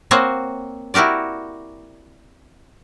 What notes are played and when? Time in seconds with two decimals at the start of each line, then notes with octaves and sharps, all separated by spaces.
0.11 A#3 C4 F#4 C5 C#5 D#5
0.94 E4 F#4 G4 A#4 D5